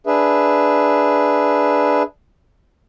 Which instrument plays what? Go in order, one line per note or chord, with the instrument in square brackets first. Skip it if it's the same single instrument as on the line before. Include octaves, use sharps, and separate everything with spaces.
[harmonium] D4 G#4 B4 E5